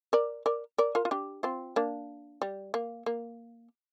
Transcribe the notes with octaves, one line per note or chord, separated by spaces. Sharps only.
A#4 D5
A#4 D5
A#4 D5
F4 A#4
F4
D4 G4
C4 F4
A#3 D4
G3
A#3
A#3